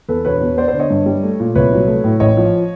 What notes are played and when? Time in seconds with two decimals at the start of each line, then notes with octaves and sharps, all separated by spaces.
0.09 E2 A4 B4
0.25 E1 B4 C#5
0.41 B2
0.58 B3 C5 D5
0.68 C5 D5
0.74 D3
0.80 C#5 D#5
0.90 G2
1.06 G3
1.23 A3
1.40 A#2
1.55 C2 B4 C#5
1.72 F#3
1.88 A3
2.04 A2
2.20 A1 C#5 D#5
2.37 F3